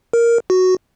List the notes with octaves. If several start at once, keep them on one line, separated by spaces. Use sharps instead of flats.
A#4
F#4